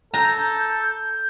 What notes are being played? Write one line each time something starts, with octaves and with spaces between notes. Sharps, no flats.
A4 A#5 G6